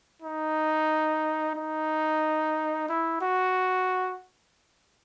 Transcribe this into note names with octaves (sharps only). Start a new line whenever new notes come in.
D#4
D#4
E4
F#4